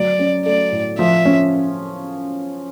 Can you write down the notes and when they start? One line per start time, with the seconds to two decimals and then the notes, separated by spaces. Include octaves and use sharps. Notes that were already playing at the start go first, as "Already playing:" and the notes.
Already playing: F#3 D5
0.19 C#4
0.46 A3 D5
0.72 A2
0.99 F3 E5
1.25 C#4